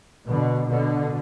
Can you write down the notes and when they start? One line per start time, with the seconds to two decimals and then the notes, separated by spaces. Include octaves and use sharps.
0.28 B2 D3
0.69 B2 D3